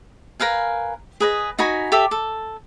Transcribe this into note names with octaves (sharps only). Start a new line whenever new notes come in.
A#4 B4 F5 G#5
G#4 B4 D#5
D#4 F#4 G#5 B5
G4 A4 E5
A4